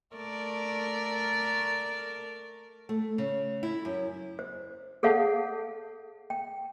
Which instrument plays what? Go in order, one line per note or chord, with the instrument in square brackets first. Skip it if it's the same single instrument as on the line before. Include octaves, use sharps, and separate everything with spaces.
[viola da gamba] A3 A#4 D5
[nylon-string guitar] A3
C#3
E4
F#2
[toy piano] C5
G#4 A4 C#5 F5 F#5 A5
G5